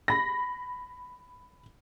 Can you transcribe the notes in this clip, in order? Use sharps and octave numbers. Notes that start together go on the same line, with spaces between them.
B5 A#6